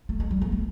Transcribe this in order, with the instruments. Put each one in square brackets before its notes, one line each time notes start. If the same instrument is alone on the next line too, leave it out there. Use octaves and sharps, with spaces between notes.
[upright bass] A3
G#3
G3
G#3
A3